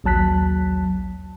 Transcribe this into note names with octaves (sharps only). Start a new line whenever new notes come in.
A#1 D#2 F#3 A5 F#6 B6